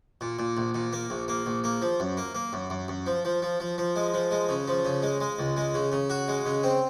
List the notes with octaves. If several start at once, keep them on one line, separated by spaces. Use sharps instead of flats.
A#2
A#2
A#1
A#2
A#3
A#1
A#3
A#1
A#3
F3
F#2
A#3
A#3
F#2
F#2
F#2
F3
F3
F3
F3
F3
G#3
F3
G#3
C#3
F3
C#3
G#3
G#3
C#2
G#3
C#3
C#3
F#4
G#3
C#3
C4